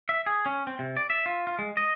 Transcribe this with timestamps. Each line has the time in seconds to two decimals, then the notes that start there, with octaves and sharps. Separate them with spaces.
0.09 E5
0.26 G#4
0.46 C#4
0.67 C4
0.79 C3
0.97 D5
1.10 E5
1.26 F4
1.47 F4
1.59 G#3
1.77 D#5